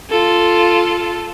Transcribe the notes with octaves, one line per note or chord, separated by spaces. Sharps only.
F4 A4